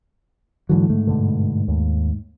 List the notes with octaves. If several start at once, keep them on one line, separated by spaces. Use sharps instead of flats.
G#2 D3 E3 F#3
G#2 A3
G2 B2 D3
D#2